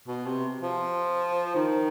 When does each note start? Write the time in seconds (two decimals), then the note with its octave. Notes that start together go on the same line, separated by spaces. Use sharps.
0.07 B2
0.26 C3
0.62 F3
1.55 D#3